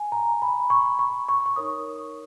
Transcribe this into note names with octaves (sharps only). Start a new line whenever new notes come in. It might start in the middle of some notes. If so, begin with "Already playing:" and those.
Already playing: G#5
A#5
B5
C#6
C#6
C#6
C#6
D#4 A#4 C#5 D#6